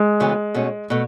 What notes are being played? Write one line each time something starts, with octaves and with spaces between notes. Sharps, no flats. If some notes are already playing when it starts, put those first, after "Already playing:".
Already playing: G#3
D2 C#3 E3 B3
B2 A3 C#4
B2 A3